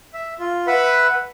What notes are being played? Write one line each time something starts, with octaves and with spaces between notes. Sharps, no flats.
E5
F4
B4 E5 F#5 B5